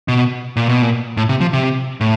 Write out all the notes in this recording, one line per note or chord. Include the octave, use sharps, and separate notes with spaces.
B2
A#2
B2
A#2
A2
C3
F3
C3
A2